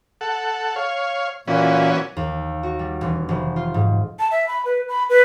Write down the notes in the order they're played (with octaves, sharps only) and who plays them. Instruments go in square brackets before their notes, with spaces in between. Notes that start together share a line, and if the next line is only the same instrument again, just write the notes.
[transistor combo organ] A4 F#5
C#5 F5
[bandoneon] A#2 A#3 [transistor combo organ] E3 C#4 F#4
[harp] D#2
F#4
G3
E1
F1
F4
G#2
[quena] A5
E5
B5
B4
B5
B4